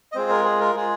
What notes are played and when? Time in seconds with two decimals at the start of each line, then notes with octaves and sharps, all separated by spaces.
0.12 D#5
0.15 G#3 C4 F4 G#4 C5
0.30 A#4
0.45 G#4
0.60 A#4
0.75 G#3 F4 G#4